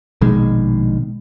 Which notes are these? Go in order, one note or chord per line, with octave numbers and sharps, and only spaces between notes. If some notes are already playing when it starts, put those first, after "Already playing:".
A#1 B2 D#3 G#3